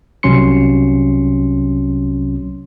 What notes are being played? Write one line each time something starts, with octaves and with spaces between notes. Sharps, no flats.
C2 C3 F#3 C#4 C6 C#7